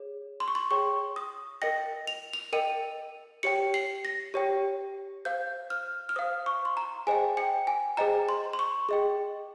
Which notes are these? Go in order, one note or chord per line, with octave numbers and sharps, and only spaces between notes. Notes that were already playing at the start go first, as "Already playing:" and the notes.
Already playing: G#4 C#5
C6
C#6
C6
G#4 C#5 G5 C#6
D#6
A#4 D#5 G5 A#6
F7
F7
A#4 D#5 G5 D#7
G4 C#5 G5 C#7
C7
A#6
G4 C#5 G5
C5 F5 G6
F6
F6
C5 F5 D#6
C#6
C6
A#5
G#4 C5 D#5 G5 G#5
G5
G#5
G#4 C5 D#5 G5 A#5
C6
C6
C#6
G#4 D#5 G5